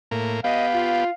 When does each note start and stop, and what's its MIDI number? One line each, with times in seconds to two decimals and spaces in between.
0.11 0.40 45
0.11 0.40 58
0.44 1.04 59
0.44 1.04 67
0.44 0.66 75
0.44 1.12 77
0.73 1.10 65